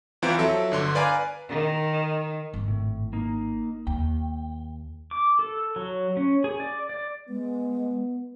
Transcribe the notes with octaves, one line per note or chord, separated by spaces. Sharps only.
E2 E3 C4 F4 A#5 D7
F3 F#3 A4 E5
G1 D3 C6
B4 D5 F5 G#5 A#5
D#3
G#1 D#3
A2
A#3 D#4
D#2 G5
D6
A4
F#3
C#4
G#4
D5
D5
G#3 B3